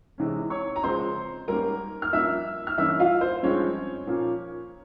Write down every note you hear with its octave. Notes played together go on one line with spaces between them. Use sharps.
C3 E3 G#3 C#4
C#5 C#6
A#5
C#3 F3 G#3 C4 C5 C6
G#2 G3 A#3 C#4 A#4 A#5
F6
G2 F3 A#3 C#4 E5 E6
F6
G2 E3 A#3 C#4 E5 E6
F4 F5
C5
G2 F3 G#3 C4 C#4 C#5
A#2 F3 A#3 C#4